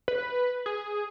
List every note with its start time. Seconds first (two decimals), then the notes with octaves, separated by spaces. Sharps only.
0.08 B4
0.66 G#4